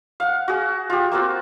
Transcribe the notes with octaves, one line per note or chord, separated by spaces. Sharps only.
F5 F#5
F#4 G#4
F4 G4
A#3 C4 F4 F#4